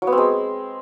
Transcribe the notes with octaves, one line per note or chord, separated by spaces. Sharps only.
F#3
B3
C4
G#3